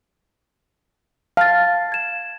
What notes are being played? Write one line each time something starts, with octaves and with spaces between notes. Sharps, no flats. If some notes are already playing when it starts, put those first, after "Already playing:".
F5 A5 F6 A6
G#6 E7